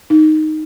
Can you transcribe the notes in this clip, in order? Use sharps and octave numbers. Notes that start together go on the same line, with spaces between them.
D#4